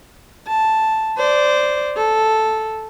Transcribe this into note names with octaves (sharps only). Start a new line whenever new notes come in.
A5
C5 D5
A4